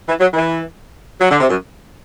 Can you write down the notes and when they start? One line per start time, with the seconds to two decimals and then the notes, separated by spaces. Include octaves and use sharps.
0.08 E3
0.20 F#3
0.34 E3
1.21 F#3
1.31 D3
1.41 C3
1.50 F#2